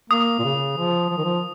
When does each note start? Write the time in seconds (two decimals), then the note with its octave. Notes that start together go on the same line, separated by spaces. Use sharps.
0.10 A#3 D#6
0.39 A#2
0.44 C#3
0.77 F3
1.10 F3
1.18 D#3
1.24 F3